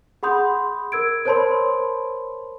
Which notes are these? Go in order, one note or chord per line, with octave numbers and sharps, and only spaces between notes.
G#4 F#5 B5 C6 D#6 G6
A#4 E6 G#6 D7
A#4 C5 C#5 A5 B5 C6